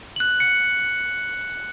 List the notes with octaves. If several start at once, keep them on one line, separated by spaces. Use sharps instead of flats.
F#6 F#7
C#7